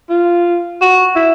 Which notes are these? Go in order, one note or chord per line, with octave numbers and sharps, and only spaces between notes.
F4
F#4
E4